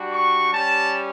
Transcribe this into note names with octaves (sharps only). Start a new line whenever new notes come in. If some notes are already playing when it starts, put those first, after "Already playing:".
Already playing: G3 D4 F#4
C#6
G3 C#4 G4 A5